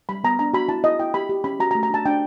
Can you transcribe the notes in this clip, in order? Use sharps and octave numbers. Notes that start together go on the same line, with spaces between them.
G3 B5
B3 A#5
D4 A#5
F#4 B5
E4 A5
E4 D#5
E4 G5
G4 B5
G4
C#4 B5
F#4 A#5
A#5
A3
A#5
D4 A5
D4 G5